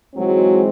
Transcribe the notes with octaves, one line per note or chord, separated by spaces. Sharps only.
G#2 E3 F#3 G#3 C4 F#4